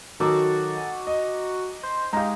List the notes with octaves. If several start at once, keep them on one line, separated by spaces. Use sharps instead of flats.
D#3 F#3 D#4 F#4 A4 D6
G#5
D#5
C5
G#3 D#4 G4 F5 A#5